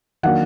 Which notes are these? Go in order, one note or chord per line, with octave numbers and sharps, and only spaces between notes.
D#3 F#3 A#3 D4 F#5